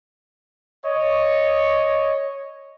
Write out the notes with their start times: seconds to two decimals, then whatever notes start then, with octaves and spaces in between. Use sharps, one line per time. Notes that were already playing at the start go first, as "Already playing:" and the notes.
0.86 C#5 D#5